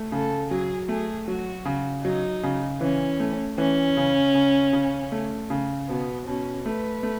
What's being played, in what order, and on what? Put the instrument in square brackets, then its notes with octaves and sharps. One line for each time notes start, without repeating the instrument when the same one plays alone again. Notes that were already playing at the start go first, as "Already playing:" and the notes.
Already playing: [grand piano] A3
[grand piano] C#3 [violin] A4
[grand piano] F#3 [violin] G#4
[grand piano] A3 [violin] G#4
[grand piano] F#3 [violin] F#4
[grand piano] C#3
[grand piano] F#3 [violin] D#4
[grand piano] C#3
[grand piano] E3 [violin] C#4
[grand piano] A3
[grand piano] E3 [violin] C#4
[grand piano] C#3
C#3
C#3
A3
C#3
[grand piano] B2 [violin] B3
[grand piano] B2 [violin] C#4
[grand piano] A3 [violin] B4
[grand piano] A3